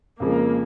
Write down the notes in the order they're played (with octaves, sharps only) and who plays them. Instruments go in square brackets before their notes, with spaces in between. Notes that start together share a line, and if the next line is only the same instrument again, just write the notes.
[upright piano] F2 C#3 F3 G#3 [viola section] A#3